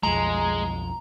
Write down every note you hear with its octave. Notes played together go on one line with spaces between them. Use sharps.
B1 F2 G#3 A#5